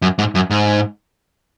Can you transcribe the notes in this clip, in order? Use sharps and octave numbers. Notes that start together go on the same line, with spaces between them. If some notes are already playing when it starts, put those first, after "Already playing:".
F#2
G#2
F#2
G#2